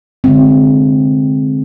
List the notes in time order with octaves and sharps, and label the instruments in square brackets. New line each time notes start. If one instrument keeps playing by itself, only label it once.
[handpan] D3 G#3 C4